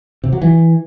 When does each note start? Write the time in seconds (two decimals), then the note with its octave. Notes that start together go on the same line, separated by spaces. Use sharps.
0.24 C3
0.33 F#3
0.42 E3